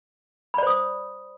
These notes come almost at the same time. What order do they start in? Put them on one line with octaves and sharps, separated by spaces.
B5 D5 C5 D#6